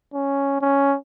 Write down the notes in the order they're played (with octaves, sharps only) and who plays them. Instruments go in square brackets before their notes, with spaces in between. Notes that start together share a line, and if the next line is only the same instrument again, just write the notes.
[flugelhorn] C#4
C#4